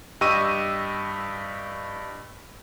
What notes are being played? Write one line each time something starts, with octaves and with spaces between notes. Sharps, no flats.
G2 G4 D#5 C#6 E6 D#7